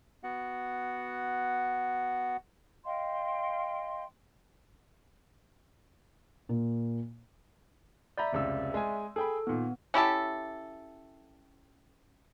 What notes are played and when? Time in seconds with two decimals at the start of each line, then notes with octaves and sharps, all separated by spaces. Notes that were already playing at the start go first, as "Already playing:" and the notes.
0.24 B3 F#4 F#5
2.85 D#5 F5 G5 C6
6.49 A#2
8.18 D5 E5 A#5 B5 G6
8.33 F1 C#2 E6
8.74 G#3 G#5
9.16 G#4 A4 G5 B5
9.47 A#2 D#3 B3
9.94 C#4 E4 G4 A4